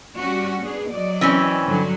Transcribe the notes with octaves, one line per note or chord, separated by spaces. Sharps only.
G3 C#4 F#4
B3 D4 G#4
F#3 D5 D#5
E3 C4 C#4
G2 D3 F#3